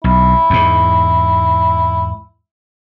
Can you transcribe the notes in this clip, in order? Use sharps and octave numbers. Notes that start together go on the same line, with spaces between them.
B1 E4
E2 G#2